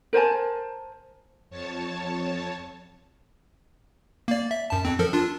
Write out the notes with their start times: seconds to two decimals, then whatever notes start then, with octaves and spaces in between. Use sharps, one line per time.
0.13 A#4 C5 G#5 A5
1.50 F2 C#5 A5
4.28 A#3 D5
4.51 E5
4.70 F#2 A5
4.85 F2 C4
4.99 F3 A4 A#4
5.13 D4 F4